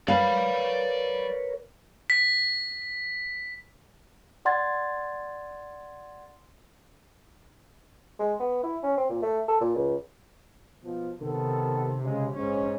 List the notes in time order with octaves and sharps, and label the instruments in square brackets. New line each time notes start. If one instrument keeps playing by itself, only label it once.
[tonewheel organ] A#4 B4 C#5 [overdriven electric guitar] D5 B5 [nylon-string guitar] F5
[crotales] B6
[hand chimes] D5 F#5 C6 G#6 A6
[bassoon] G#3
B3
E4
C#4
C4
A#2
A3
A4
A#2
C#2
[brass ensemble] B2 F3
[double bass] C3 [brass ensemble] D#3 B3 A4
[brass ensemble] C#3 G#3
[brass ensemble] G#2 [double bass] C#4